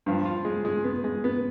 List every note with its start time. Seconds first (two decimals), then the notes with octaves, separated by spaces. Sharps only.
0.06 G2 F3
0.25 F4
0.45 G#3
0.65 G#3
0.84 B3
1.04 G#3
1.24 B3